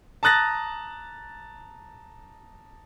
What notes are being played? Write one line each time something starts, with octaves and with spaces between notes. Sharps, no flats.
A5 A#5 D#6 F#6 A6 A#6